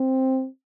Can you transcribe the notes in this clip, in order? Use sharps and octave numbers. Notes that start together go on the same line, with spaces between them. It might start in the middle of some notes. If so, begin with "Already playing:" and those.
Already playing: C4